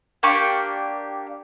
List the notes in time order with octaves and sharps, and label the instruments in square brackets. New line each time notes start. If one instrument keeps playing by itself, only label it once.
[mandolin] A#3 D4 G4 C#6